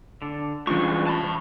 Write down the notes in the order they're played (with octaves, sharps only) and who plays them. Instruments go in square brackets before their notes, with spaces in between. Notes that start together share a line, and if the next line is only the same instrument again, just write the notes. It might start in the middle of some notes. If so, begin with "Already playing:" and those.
[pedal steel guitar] D3 D4
[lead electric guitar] G2 G#3 [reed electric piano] E3 C#4 F4 [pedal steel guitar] C5 C#6
[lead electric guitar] A5 B5